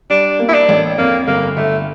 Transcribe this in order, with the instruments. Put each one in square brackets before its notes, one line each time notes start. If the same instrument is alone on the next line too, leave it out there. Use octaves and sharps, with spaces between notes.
[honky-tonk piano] G3 [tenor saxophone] D4
[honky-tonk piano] A#3
[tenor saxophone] E4
D4
[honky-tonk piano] A1
[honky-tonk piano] F2 [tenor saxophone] A#3
[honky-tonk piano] G1 [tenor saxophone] A#3
[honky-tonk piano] G1 [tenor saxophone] A3